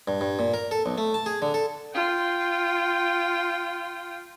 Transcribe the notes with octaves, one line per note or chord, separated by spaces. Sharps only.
G2
G2
A#2
A#4
A4
B1
A3
A5
G#4
D3
A4
F4 G5